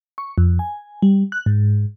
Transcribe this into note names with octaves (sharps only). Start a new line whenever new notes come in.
C#6
F2
G#5
G3
F#6
G#2